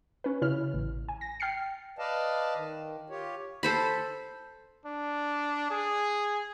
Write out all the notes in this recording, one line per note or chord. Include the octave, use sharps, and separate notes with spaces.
C#4 B4
C#3 E4 C#5 F6
A1
G#5
A#6
G5 F6 A6 C7 C#7
B4 D5 D#5 F5 A5
D#3
F4 G4 C#5
A4 C5 B5
D4
G#4